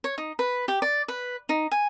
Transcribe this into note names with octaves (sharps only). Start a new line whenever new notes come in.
C#5
D#4
B4
G4
D5
B4
D#4
G#5